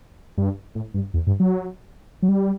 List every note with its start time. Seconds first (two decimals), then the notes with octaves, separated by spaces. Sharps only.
0.38 G2
0.75 A2
0.94 G2
1.14 E2
1.27 G2
1.40 F#3
2.23 F#3
2.29 G3